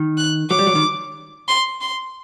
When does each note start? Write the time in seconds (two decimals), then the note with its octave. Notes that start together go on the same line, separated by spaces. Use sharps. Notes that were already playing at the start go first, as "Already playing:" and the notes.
Already playing: D#3
0.17 F#6
0.50 F#3 D6
0.59 G3
0.67 F#3
0.75 D#3
1.48 C6
1.81 C6